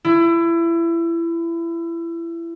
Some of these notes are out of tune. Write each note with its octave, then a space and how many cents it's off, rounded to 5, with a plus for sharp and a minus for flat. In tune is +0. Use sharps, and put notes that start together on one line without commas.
E4 +25